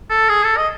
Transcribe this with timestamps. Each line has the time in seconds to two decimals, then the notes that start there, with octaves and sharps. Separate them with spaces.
0.10 A4
0.29 G#4
0.44 A4
0.57 D#5